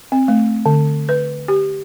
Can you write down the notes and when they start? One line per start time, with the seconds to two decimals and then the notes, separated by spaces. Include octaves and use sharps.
0.12 C4
0.28 A3
0.66 D3
1.09 B4
1.48 G4